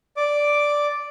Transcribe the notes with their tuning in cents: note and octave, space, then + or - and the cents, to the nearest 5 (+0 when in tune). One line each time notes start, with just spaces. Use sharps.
D5 +0 D6 +0